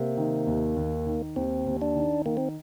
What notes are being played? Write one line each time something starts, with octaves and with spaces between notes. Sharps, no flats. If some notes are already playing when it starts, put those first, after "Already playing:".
Already playing: C3 A#3
D#3
D#2
D#2
D#3
D#2 C4
D#2
D4
D#3
D#3 A#3
C4